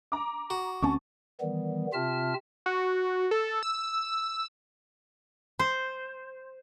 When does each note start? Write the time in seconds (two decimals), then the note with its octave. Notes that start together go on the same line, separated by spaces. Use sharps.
0.12 A#5 D6
0.50 F#4
0.82 D2 C4 C#4 G#5 A5 C#6
1.41 D#3 E3 G3 B3
1.93 C3 C4 F4 E5 A5 F6
2.66 F#4
3.31 A4
3.63 E6
5.59 C5